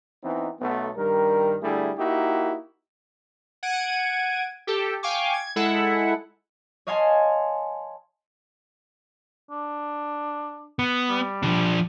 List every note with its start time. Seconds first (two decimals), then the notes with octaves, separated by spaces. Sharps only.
0.24 E3 B3 C4 D#4
0.61 B1 A3 B3
0.96 G2 D#3 G3 A#4
1.63 D3 G3 A3 E4 G#4
1.98 A#3 D#4 E4 F#4 G4
3.63 F#5 G#6 D7 D#7
4.67 G4 A4
5.03 F5 G5 G#5 C#6 D6
5.34 G#6
5.56 G#3 E4 A4 E5 F#5
6.87 C#5 D#5 F5 G#5 A5 C6
9.51 D4
10.79 B3
11.09 G3
11.43 F3 D4